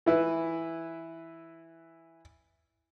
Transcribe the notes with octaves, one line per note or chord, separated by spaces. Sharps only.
E3 E4 B4